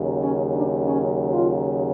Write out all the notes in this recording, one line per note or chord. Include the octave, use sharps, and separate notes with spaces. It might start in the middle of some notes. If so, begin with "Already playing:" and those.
Already playing: D#2 C#3 F#3
C#4
D4
C#4
F4